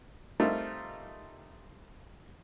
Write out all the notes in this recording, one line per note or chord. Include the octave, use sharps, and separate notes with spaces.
G3 A3 C4 D#4 F4 A#4